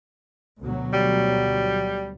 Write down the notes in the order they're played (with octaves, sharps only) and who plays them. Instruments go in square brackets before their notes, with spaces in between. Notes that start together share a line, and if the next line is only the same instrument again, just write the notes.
[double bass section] D2 B2 F#3
[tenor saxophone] G3